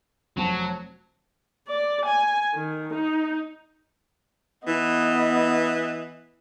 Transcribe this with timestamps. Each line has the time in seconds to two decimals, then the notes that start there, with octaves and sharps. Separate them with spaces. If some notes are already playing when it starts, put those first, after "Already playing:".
0.37 F1 F#3 C4 A5
1.68 D5
2.06 G#5
2.55 D#3
2.94 D#4
4.68 E3 B3 D#5